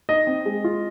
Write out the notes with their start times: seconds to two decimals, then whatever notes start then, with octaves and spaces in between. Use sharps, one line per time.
0.09 D#4 D#5
0.27 C4
0.46 G#3
0.64 F4